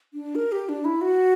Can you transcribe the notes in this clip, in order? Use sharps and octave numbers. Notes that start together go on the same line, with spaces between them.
D4
A#4
G4
D4
E4
F#4